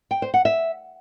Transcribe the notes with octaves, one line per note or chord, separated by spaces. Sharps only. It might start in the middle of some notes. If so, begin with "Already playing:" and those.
G5
C5
F#5
E5